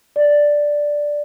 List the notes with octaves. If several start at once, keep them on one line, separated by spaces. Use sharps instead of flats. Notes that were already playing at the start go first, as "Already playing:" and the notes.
D5